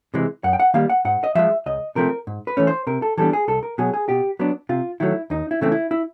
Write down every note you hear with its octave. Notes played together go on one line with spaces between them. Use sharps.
C3 E3 G#3
F#2 F#5
G5
F#5
D#3 G3 A#3 F5
F#5
G#2 F#5
D#5
F3 G#3 E5
C#2 D#5
C3 F3 A3 C4 A#4
G#2
B4
E3 A3 C#4
C5
C3 A#4
A4
E3 G3 B3 D4 A4
G#4
C2 A4
A#4
B2 F#3 G#4
G#4
B2 G4
F#3 B3 D4
C3 F4
D#3 F#3 A3 E4
D#2 D#4
E4
C#3 E3 A3 C4
E4
E4